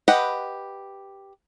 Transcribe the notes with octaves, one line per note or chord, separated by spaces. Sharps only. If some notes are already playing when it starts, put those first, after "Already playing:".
G4 B4 D#5 F#5